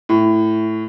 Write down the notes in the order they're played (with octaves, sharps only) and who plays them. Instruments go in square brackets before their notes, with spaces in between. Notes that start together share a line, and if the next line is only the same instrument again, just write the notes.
[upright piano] A2